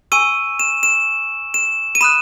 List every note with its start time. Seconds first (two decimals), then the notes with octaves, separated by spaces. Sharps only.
0.12 G#5 C#6 E6 D#7
0.60 E7
0.83 E7
1.54 E7
1.95 D#7
2.01 B5 D#6 F#6 E7